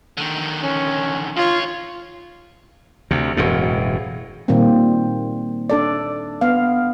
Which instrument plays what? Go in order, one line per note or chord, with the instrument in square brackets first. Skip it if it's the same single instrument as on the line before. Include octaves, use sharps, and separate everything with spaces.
[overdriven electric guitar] D3 D#3
[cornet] C#4
[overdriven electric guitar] C#2 C#5 [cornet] F4
[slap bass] D2 C3
E1 F#2 A2
[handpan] A#2 D#3 G3 A#3 C4
D4 A4 D5
B3 F5